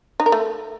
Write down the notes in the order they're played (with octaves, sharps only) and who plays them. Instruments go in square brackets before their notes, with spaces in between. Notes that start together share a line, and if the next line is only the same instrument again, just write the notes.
[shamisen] D#4
A#4
A3